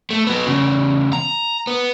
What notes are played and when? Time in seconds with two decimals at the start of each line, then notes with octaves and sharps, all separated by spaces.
0.10 A3
0.27 F#3 B3
0.46 E2 C#3
1.13 A#5
1.67 B3